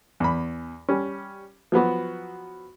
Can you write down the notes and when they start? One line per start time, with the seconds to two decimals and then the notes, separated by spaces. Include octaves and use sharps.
0.20 E2 B5
0.89 G3 C#4
1.72 F3 F#3 B3 F#4